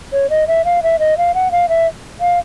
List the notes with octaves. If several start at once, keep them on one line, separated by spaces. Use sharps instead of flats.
C#5
D#5
E5
F5
E5
D#5
F5
F#5
F5
E5
F5